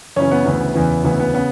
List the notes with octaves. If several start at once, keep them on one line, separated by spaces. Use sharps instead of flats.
F#2 C#3 E3 C#4
B3
D2 C#3 E3 B3
E2 C#3 E3
D2 C#3 E3 B3
B3
C#3 B3